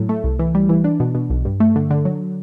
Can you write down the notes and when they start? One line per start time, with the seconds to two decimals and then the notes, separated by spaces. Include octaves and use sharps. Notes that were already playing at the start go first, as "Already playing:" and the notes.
Already playing: A2 F#3
0.09 A3
0.24 C2
0.39 E3
0.55 G3
0.69 E3
0.84 D4
1.00 B2
1.15 B2
1.30 B1
1.45 G2
1.60 A3
1.76 D3
1.91 D3
2.05 F#3